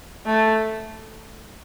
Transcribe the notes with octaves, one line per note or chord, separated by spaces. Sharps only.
A3